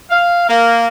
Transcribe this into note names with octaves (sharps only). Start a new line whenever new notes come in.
F5
A#3